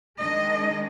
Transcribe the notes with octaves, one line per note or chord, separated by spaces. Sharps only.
D#3 G#3 D4 D#5